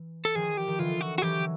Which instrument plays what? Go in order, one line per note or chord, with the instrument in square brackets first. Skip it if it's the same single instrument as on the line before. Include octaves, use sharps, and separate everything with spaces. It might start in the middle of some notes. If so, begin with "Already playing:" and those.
Already playing: [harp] E3
[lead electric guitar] A4
[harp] D#3 F3 [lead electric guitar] G#4
[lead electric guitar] G4
[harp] D#3
[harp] D3 E3 [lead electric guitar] F4
[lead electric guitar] F#4
F#4
[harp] E3 F#3 [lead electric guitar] G4